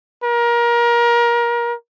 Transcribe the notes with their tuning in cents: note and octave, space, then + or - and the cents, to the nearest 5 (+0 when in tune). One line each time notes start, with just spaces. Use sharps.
A#4 +25